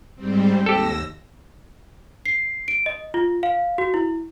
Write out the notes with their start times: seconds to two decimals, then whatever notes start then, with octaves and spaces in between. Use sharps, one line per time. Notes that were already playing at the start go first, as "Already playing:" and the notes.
0.16 G#2 G3 C4
0.66 D#2 G4 A4 E6 A#6
2.26 C7
2.68 D7
2.86 D#5
3.14 F4
3.43 F5
3.78 F#4
3.94 E4